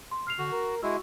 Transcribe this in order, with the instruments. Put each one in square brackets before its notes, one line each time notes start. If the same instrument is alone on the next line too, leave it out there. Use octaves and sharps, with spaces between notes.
[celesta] C6
F6 C7 F7
[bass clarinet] D3 [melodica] F#4
[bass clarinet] A#4
[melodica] G#3 E4 [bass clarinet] F#4 [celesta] E6